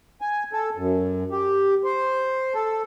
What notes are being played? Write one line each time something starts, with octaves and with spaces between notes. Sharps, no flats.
G#5
A4
F#2
G4
C5
A4